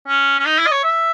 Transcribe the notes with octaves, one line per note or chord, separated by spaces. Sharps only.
C#4
C#4
D#4
E4
D#5
C#5
E5